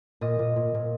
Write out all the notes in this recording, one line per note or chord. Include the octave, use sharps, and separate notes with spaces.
A#2 D#5
A#2
A#2
A#2